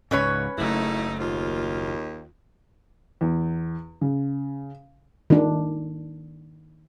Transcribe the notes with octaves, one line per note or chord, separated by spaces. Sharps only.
C#2 G#2 C#4 B4 C#5
F#1 F#2 A3 D#4 E4
D#2 F4
E2
C#3
D#3 D4